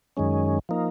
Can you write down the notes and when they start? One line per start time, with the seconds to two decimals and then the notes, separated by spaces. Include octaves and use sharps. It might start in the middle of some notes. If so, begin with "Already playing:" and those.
0.17 F#2 D#3 G#3 C#4
0.69 F3 A#3 D#4